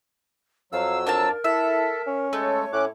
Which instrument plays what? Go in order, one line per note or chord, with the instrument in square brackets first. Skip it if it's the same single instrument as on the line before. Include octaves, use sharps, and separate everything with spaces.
[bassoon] F2 [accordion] F#3 E6 [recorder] F5
[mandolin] D4 F5 A5 [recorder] A#4
[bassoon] E4 [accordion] A4 [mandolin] E5
[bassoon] C#4
[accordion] G#3 A4 [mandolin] A3 [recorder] C#5
[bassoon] A2 [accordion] C#4 D6 F#6